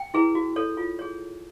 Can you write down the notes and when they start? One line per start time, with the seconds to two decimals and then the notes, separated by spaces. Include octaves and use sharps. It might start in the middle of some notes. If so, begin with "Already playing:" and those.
Already playing: G5
0.14 E4 G#4 B4
0.35 F#4
0.56 A4 C#5
0.77 F4
0.99 G#4 C#5